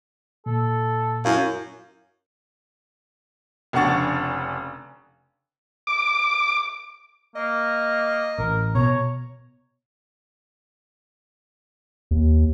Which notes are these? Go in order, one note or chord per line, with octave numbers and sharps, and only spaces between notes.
A#2 A4
F#2 E4 F5
F1 C#3 D4 F#5 C#6 A6
D6
A#3 D#5
A1 A#4
B2 C#5 A#5
D#2